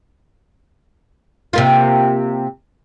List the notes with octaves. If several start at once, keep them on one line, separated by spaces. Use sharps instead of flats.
C3 A#3 F4